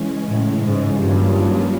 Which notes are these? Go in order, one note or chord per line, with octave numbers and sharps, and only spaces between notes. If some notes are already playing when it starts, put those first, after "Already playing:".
Already playing: C#3 E3 G#3 C#4
A2
G#2
G2 D#3 F#3 A#3 C#4 F4